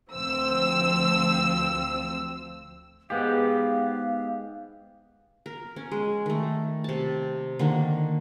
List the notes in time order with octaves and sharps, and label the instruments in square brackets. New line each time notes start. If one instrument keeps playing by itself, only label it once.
[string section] D2 F3 C4 E6
[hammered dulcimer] G#2 [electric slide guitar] B3 G4 [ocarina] F5
[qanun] A#4
C#4
G#3
D#3 A3
C3 A5
D3 D#3 A#3